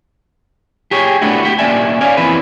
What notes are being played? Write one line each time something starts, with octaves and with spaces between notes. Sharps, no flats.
G4 G#4 C#5
A3 B3 D4 E4 F#4
F#4 G4
A#3 C#4 D5 E5 G#5
C#5 D5 F5 G#5
F2 E3 C4 E4 B4